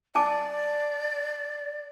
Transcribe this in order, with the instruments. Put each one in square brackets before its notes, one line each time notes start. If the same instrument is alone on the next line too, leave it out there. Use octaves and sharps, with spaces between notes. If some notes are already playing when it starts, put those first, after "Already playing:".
[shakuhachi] D5 [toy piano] G#5 A5 D6